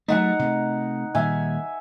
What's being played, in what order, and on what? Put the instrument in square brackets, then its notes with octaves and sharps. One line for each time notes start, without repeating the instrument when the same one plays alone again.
[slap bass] F#3 G3 A3 [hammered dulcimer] D#4 F#5 A#5
[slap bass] C3 A3
[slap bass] A#2 D#3 G3 [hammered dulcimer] E5 G#5